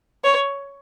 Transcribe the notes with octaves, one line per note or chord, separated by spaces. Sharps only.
C#5